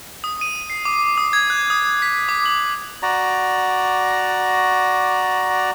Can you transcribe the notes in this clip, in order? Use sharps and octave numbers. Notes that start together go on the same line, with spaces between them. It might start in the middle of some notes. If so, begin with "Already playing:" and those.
D#6
D#7
C7
D6
D#6
G#6
F#6
D#6
B6
D6
F#7
F#4 D5 A#5